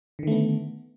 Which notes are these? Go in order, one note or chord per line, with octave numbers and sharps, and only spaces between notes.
D3 D#3 A3 B3